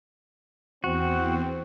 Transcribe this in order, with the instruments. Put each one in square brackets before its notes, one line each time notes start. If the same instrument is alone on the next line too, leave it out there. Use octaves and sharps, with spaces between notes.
[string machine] E2 [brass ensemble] C4 [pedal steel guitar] F#4